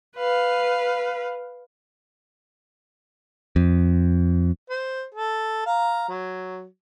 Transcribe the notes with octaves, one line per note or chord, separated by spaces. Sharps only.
B4 F5
F2
C5
A4
F5 A#5
F#3